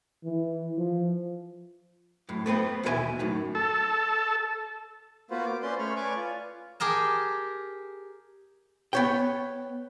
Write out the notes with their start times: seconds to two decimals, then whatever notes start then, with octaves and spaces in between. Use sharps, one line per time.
0.24 E3
0.77 F3
2.29 F#2 A2
2.46 A3 B3 C4 B4
2.83 D#2 B2 E3 A#4 E5 G#5
3.19 F#2 A2 D#3
3.55 A4
5.31 A#3 B3 F4 F#4 B4 C5
5.46 D6
5.63 C#4 B4 C5 D5 C6
5.79 A3 C#5 B5 F6
5.96 B4 C#5 D5 G#5 C#6 D6
6.16 F4
6.80 G4 G#4 A#4 A5
8.93 B3 C#5 G5